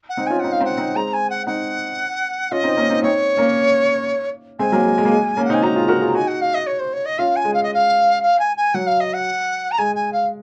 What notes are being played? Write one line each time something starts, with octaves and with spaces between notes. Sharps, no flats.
F#5
C4 D#4
C#4 F4 G#5
C4 D#4 F#5
F5
C4 D#4
F#5
C4 D#4
G#3 C4 A#5
G#5
F#5
C4 D#4 F#5
C#4 F4 D#5
C4 D#4
A#3 C#4
C4 D#4
C4 D#4 C#5
A#3 C#4
G#3 C4 G#5
F#3 A#3
G#3
G#3
A#3
G#3
A#3 C#4
F#5
C4 D#4
G#5
D#4 F#4 A#5
F4 G#4
F#4 A#4
F4 G#4
D#4 F#4 G#5
F#5
F5
D#5
C#5
C5
C#5
D#5
C#4 F4 F5
G#5
G#3
F5
D#5
F5
F5
G#5
G#5
F#3 F#5
F5
D#5
F#5
A#5
G#3 G#5
G#5
F5